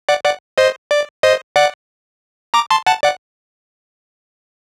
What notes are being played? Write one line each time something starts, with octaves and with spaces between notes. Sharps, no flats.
D5 F#5
D5 F#5
C5 D#5
D5
C5 D#5
D5 F#5
A#5 D6
A5 C6
F#5 A5
D5 F#5